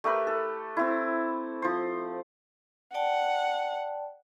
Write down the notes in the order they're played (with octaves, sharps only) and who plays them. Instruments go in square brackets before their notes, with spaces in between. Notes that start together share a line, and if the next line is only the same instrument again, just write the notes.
[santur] A3 G4 A#4 B4
A4
C4 E4
F3 C5
[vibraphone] D5 G5 A5 [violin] F#5